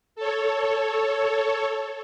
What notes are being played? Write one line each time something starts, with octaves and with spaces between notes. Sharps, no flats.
A4 C#5